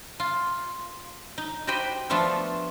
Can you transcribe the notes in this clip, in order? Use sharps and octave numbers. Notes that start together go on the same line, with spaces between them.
F4
D#4
F#4 G4 C5 D#5 G5 B5
F3 A3 B3 D4 F4 A4